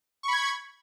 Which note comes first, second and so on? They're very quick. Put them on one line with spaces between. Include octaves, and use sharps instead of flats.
C#6 B5 G#6